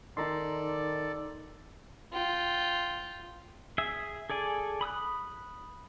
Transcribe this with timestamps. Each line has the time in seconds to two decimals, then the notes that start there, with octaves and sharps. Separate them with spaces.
0.17 D#3 D#4 A4 D5 A#5 C6
2.13 F4 G5
3.78 G#4 E5
4.30 G#4 A4 D5 G#5
4.81 B5 D#6 E6 F#6